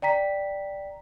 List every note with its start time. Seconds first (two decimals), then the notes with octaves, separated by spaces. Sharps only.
0.02 D5 G5 A#5 B6